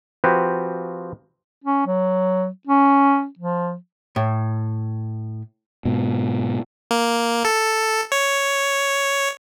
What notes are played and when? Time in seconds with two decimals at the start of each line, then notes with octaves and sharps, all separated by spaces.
0.24 F3 C4 F#4 G4 B4
1.64 C#4
1.86 F#3
2.67 C#4
3.39 F3
4.16 A2
5.85 G#2 B2
6.91 A#3
7.45 A4
8.12 C#5